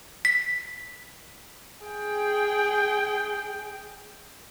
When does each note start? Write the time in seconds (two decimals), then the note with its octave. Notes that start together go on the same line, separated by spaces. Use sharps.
0.25 B6
1.86 G#4 G5